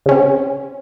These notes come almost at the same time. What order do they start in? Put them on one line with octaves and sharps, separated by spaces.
C#3 C#4 C4